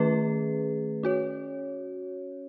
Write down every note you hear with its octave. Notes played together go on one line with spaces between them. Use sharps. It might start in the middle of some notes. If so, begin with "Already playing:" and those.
Already playing: D#3 A3 C#4 G#4 B4
C#4 F#4 C#5